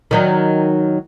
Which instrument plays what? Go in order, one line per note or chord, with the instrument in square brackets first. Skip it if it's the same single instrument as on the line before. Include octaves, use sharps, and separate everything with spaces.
[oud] D#3 F#3 D#4